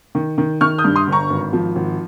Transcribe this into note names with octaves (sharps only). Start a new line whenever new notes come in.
D#3
D#3
D#3 C#6 F6
D#6 G6
G2
C6 D#6
G1
A#5 C#6
G#1
F3
G#1